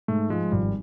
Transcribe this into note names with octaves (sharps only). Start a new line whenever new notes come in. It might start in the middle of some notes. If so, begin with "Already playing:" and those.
G#2 A3
F3 G#3
G#1 G3